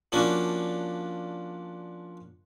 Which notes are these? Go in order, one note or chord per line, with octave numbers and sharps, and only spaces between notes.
F3 A#3 C#4 D4 F#4